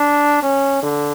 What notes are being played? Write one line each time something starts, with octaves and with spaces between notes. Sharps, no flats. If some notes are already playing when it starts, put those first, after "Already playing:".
Already playing: D4
C#4
D3